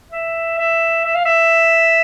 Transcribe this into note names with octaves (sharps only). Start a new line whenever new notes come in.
E5
E5
E5
F5
E5